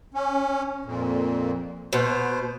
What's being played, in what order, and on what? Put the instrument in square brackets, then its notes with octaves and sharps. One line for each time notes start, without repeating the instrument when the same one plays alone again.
[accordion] C#4
F2 A#2
[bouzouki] B2 [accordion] C5